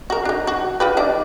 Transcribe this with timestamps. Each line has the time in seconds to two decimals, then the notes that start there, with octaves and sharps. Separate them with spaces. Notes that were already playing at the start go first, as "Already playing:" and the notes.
0.10 F#4 A#4
0.25 D4 D#4
0.47 F#4
0.80 F4 G4 B4
0.97 D4 D#4 D5